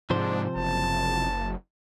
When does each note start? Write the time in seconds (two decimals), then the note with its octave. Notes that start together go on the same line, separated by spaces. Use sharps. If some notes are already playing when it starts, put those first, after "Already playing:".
0.10 G#2 C3 F3 D4 C5
0.56 F#1 A5